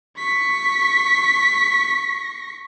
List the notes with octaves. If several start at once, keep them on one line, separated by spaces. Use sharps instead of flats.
C#6 B6